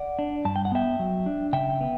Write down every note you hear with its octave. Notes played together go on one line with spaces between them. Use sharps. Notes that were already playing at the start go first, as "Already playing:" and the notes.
Already playing: D5 F#5
D4
G2 A5
G5
F#5
B3 E5 G5
F#3
D4
C#3 E5 G5
B3